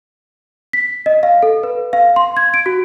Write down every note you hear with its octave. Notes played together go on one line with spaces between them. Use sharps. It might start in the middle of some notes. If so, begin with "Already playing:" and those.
B6
D#5
F5
A4
B4
F5
C6
G#6
D7
F#4